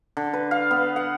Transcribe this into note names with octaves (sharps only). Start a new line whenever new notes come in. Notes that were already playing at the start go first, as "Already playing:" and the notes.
D3
B4
F5
B3
F#5